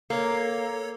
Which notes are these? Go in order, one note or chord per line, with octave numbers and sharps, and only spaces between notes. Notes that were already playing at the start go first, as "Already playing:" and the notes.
A#3 A4 C#5